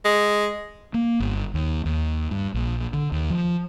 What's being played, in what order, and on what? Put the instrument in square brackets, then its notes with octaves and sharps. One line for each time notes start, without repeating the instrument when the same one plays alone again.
[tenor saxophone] G#3
[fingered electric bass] A#3
G1
D#2
D#2
G2
A#1
D3
D#2
F3